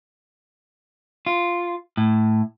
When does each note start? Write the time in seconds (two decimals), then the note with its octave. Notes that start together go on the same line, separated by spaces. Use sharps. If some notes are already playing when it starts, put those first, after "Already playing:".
1.27 F4
1.97 A2